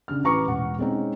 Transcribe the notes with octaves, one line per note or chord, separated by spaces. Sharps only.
C#3 D4 F6
A1 B4 A#5 C#6 D6 C#7
E1 F#5
G#3 C4 C#4 D#4